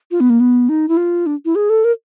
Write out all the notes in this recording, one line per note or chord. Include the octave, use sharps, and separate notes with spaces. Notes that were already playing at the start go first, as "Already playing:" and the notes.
F4
B3
A#3
B3
D#4
E4
F4
D4
E4
G#4
A4
A#4